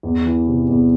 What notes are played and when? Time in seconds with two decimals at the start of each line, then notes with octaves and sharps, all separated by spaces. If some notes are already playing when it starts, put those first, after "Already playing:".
0.03 E2
0.25 E3
0.47 C3
0.69 E2